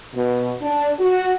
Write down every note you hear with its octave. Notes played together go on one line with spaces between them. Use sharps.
B2
D4
F#4